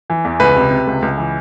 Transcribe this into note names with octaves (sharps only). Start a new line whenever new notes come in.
E3
E2
C#2 B4
C3
C3
C#2
C#2
E3